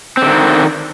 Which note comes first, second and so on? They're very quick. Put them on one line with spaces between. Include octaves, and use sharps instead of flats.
C4 D3 D#3